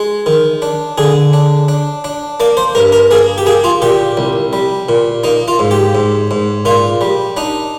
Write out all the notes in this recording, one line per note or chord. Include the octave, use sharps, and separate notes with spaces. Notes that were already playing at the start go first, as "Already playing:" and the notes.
Already playing: G#3
D#3
D4
D3 G#4
D4
D4
D4
A#3 D5
C5
G2 A#4
A#4
A#3 G#4
G4
A#3 G#4
F4
A#2 G4
C2
G3
A#2
A#3 D#4
F4
G#2
G4
G#2
G#2
A#2 F4
G3
D4 D#4